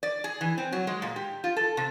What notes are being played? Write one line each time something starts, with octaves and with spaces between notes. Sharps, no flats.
D5
G#4
E3
C4
F#3
G#3
A#2
G4
F4
A4
C3